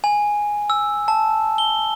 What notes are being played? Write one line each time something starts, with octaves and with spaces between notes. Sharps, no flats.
G#5
E6
A5
G7